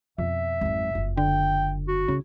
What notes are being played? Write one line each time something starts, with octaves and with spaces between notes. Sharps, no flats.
F2 B2 E5
G#1 F#2
F#1 F4
D3 G5
F#4
C#3 E4